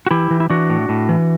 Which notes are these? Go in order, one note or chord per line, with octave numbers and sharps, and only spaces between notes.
F#4
E3 E4 G4
E3
E4
E3 D4 F#4
A2
A2
E3